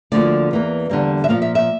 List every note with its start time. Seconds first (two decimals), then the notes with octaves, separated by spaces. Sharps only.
0.12 D2 D3 F3 A#3 D5
0.51 E2 E3 A#3
0.90 E2 D3 G3 A#3
1.24 E5
1.29 A#2 F3 A#3 F5
1.42 E5
1.55 E5